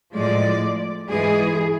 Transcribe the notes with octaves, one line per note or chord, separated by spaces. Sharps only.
A2 F3 G#3 D5
G#2 E3 G#3 G#4